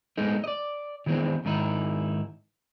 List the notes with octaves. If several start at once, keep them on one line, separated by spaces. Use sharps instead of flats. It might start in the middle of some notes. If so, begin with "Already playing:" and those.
G#3 A3 B3 D#4
D5 D#5
D#3 E3 G#3 B3 C4 D4
G#2 D#3 D#4 E4